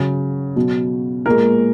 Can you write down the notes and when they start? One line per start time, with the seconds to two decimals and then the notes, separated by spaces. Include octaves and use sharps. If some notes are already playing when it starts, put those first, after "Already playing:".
Already playing: C#3 F#3
0.56 B2 F#3
1.26 A#2 G#3 A#4